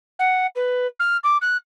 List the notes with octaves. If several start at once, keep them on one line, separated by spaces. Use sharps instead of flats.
F#5
B4
F6
D6
F#6